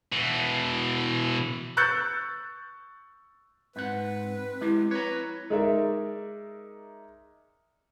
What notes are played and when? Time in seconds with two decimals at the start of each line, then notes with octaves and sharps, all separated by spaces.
0.12 B2 E3
1.77 C#6 E6 F#6 G6 A6 C#7
3.76 G#2 C4 B4 F#5
4.61 G#3 E4 G4
4.91 B4 C#5 A#5
5.50 G#3 D#4 A#4 D5 E5